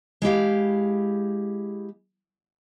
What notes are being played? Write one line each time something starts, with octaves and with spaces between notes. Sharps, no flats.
G#3 E4 G4 F5